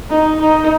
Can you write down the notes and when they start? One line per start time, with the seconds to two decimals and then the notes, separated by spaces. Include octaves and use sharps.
0.10 D#4
0.41 D#4